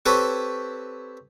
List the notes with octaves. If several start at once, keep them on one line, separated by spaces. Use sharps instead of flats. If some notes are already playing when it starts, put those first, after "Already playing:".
C4 G4 A4 B4 C#5